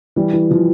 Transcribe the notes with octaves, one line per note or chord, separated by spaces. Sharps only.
E3 G3
E3
E3 F3